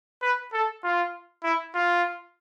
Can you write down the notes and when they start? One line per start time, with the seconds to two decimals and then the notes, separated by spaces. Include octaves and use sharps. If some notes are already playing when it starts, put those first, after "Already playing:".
0.22 B4
0.53 A4
0.84 F4
1.44 E4
1.75 F4